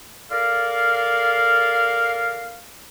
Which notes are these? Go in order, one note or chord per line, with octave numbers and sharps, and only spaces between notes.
A4 A#4 D5 F5